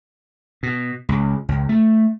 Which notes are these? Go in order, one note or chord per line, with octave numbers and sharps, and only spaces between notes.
B2
C#2
C#2
A3